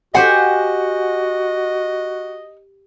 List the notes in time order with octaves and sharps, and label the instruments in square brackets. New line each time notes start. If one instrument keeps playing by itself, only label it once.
[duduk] F#4 [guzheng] G4 C5 C6 [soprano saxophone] D#5 [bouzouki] F#5 G#5